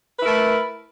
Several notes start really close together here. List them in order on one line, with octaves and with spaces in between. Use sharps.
B4 E4 A#4 A3